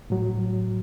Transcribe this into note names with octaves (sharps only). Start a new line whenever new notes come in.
A2 F#3